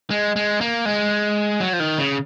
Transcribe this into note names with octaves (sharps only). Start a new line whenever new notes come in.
G#3
G#3
A#3
G#3
F#3
F3
D#3
C#3